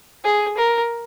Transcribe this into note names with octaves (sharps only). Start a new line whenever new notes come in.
G#4
A#4